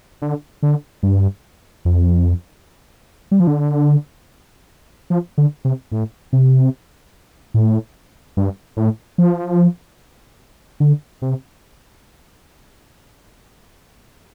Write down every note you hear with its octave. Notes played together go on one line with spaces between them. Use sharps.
D3
D3
G2
F2
G3
F3
D3
F3
D3
C3
A2
C3
A2
G2
A2
F3
D3
C3